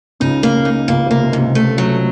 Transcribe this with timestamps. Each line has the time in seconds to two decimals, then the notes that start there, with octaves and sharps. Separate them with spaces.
0.20 C#2 C#3 D#4
0.43 A#3
0.65 D#4
0.88 C#2 C#3 A#3
1.05 C3
1.11 A#3
1.22 C3
1.33 G#2
1.39 C3
1.55 A3
1.78 F#3